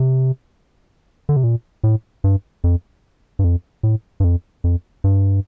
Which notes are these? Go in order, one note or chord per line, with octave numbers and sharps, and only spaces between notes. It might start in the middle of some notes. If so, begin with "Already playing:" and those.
Already playing: C3
D3
C3
A#2
A2
G2
F2
G2
F2
A2
G2
F2
F2
G2